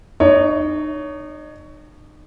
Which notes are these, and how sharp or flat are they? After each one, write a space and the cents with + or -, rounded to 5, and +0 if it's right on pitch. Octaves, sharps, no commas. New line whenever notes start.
D#4 -35 C#5 +15